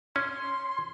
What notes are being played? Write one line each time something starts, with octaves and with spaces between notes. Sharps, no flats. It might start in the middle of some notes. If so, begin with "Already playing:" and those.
C#4 C6